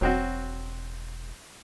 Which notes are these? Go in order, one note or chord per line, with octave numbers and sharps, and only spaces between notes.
E1 F#3 C4 F#4